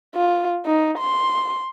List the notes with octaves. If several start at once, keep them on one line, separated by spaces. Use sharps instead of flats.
F4
D#4
C6